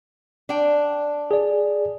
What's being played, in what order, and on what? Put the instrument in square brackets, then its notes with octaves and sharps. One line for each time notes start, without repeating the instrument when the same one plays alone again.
[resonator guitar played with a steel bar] D4 G5
[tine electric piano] G#4 D5